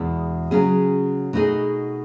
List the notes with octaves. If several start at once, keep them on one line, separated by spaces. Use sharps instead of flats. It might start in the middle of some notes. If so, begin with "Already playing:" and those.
Already playing: E2 B2 G#3 B3 E4
C#3 F#3 C#4 G#4
B2 A3 D#4 G#4